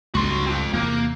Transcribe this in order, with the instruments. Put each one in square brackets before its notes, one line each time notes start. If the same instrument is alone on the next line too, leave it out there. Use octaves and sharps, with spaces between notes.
[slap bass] C#2 G2 [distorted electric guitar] F#4 C6
[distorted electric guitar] C4 F4
[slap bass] E2 C3 [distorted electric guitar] A#3